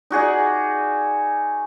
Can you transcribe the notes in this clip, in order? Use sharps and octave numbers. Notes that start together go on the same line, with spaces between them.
D#4 F#4 G#4 D5